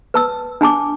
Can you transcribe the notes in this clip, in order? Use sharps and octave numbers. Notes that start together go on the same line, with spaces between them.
B4 A5 E6
D4 G#5 A5 D6